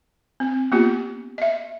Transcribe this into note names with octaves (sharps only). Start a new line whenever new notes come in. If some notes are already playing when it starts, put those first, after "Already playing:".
C4
A#3 B3 C#4 F4 G4
D#5 E5